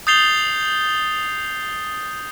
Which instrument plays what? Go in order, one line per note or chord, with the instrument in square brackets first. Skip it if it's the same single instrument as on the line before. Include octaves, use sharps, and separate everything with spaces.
[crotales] D#6 G6 A6 C7 F7 G7